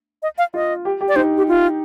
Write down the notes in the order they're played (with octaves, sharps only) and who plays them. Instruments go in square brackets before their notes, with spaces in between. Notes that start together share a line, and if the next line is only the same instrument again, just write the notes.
[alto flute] D#5
F5
[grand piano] F4 [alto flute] D#5
[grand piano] G4
G4
[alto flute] D5
[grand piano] D#4 [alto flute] C5
[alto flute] G4
F4